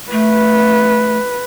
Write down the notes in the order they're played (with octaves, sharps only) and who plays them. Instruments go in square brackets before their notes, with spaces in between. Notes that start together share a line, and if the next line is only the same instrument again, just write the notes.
[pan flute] A3 [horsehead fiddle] B4